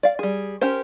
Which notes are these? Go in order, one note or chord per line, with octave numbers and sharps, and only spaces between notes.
D5 F5
G3 G#4
C#4 G4 A#4 C5